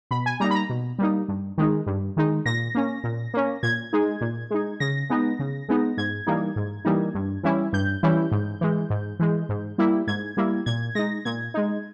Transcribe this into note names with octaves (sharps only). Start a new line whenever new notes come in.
B2 B5
G#5
G3 A#3 D#4 A#5
B5
A#5
B2
G3 A#3 D#4
G2
D#3 G#3 D#4
G2
D#3 G#3 D#4
A#2 A#6
A#3 C#4
A#2
A#3 C#4
A#2 G#6
G#3 D#4
A#2
G#3 D#4
C#3 A#6
G#3 B3 D#4
C#3
G#3 B3 D#4
G#2 G#6
E3 G3 A#3 D#4
G#2
E3 G3 A#3 D#4
G2
E3 G3 C#4 E4
G2 G6
E3 G3 C#4 E4
G#2
E3 G#3
G#2
E3 G#3
G#2
G3 A#3 E4
G#2 G#6
G3 A#3 E4
A#2 G#6
G#3 D#4 A#6
A#2 G#6
G#3 D#4